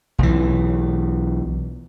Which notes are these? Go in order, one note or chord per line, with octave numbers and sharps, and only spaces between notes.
B1 E3